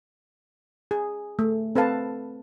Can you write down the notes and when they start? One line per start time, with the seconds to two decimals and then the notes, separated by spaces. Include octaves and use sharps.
0.91 G#4
1.39 A3
1.75 C4 A4 B4 F5 A5